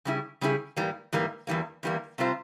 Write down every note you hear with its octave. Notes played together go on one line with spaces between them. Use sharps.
C#3 G3 C#4 E4 G#4
C#3 G3 C#4 E4 G#4
G#2 E3 G3 A#3
G#2 E3 G3 A#3
E2 E3 G3 A#3
E2 E3 G3 A#3
C3 G3 C4 F4 C5